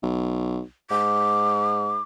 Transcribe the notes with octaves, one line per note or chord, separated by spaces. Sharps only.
B1
G#2 D6